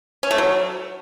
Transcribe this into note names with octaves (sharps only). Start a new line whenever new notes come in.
C#4
A3
F#3